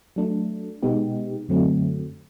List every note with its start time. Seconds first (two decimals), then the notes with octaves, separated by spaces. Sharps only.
0.16 F#3 A3 D4
0.82 B2 G#3 B3 D#4 G4
1.48 F#2 D3 F#3 A3 C4